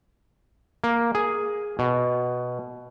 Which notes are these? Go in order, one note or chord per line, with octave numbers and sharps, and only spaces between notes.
A#3
G#4
B2